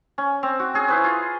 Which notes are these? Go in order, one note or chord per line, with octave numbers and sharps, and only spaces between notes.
C#4
C4
F#4
C#4 G#4
E4 B4 C5
F4